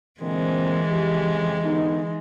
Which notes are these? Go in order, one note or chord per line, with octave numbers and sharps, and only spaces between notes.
A#2 D3 E3 G#3 C4
F2 C#3 G4
D3 B3 D#4